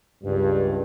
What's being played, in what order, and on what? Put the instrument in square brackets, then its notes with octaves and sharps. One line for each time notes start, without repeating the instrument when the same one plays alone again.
[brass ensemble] C#2 G2